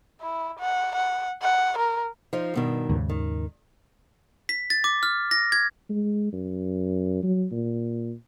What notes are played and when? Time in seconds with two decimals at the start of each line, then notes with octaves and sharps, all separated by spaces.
0.21 E4
0.59 F#5
0.95 F#5
1.43 F#5
1.78 A#4
2.33 F3 D#4 F4
2.54 G2 B2 D#3
2.89 D#2 G#2 C#3
3.09 D#3
4.49 B6
4.70 A6
4.84 D6
5.03 F6
5.31 A#6
5.52 G#6
5.90 G#3
6.32 F#2
7.23 F#3
7.52 A#2